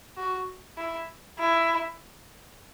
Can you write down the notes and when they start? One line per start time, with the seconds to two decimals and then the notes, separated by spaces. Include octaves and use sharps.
0.18 F#4
0.78 E4
1.39 E4